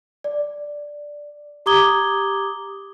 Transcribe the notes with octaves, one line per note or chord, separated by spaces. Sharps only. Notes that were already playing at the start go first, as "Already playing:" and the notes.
D5
G4 A#5 D6 D#6 G#6 G7